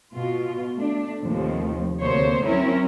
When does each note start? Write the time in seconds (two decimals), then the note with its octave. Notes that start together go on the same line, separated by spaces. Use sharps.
0.14 B2 F4
0.74 A3 D4
1.22 D#2 A2 C3 F3
2.01 D2 C3 A#3 C5 C#5
2.45 F#3 C4 C#4 E4 A#4